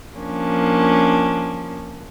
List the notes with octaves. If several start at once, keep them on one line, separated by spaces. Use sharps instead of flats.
F3 A#3 C#4 D4